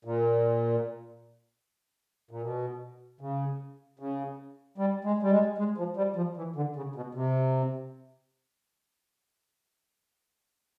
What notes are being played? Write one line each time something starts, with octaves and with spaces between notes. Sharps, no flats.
A#2
A#2
B2
C#3
C#3
G3
G#3
G3
G#3
G#3
F3
G3
F3
E3
D3
C#3
B2
C3